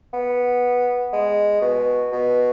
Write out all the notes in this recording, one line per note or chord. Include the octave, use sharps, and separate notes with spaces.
B3
G#3
B2
B2